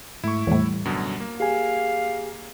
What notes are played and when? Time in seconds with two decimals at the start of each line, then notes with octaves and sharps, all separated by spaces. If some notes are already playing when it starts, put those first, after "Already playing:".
0.24 G#2 A3 E4 C#6
0.47 E2 A2 G3
0.85 F#2 B2 D3
1.20 A#3
1.40 G4 G#4 F5 G#5